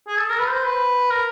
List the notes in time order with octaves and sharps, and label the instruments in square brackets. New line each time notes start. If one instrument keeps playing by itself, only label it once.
[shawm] G#4
A4
A#4
B4
C5
B4
A#4